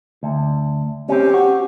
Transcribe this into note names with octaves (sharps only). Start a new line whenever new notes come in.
D2
C4 C#4 G4
F#4